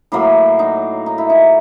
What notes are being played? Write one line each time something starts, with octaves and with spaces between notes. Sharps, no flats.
A2 F#3 A#3 E4
D#4
D#4
E4
D#4